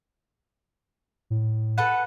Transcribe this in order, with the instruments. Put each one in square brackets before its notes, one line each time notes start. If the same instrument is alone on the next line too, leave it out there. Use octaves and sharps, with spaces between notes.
[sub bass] A2
[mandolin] A4 B4 F#5